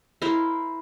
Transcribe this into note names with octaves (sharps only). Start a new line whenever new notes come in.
E4 A#4 C5 F5